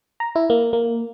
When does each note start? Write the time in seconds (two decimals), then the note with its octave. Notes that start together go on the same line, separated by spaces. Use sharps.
0.20 A#5
0.36 E4
0.50 A#3
0.73 A#3